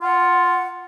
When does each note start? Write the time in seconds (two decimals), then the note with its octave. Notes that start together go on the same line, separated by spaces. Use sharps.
0.02 F4 F#5